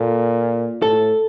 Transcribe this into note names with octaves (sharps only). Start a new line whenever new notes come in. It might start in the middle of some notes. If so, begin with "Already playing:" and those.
Already playing: A#2 A4
A2 A4